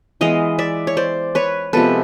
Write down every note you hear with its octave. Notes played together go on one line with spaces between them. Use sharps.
E3 G#3 B3 D#5 F5
D5 E5
C#5
C5 D5
B4 C#5
C3 F3 G#3 B3 A4 B4